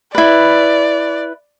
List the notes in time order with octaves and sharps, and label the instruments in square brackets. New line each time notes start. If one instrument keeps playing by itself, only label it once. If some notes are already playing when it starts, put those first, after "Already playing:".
[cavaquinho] E4 B4 [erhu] D5